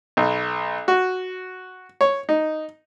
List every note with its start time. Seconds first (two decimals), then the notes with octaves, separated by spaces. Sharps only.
0.17 B1
0.88 F#4
2.01 C#5
2.29 D#4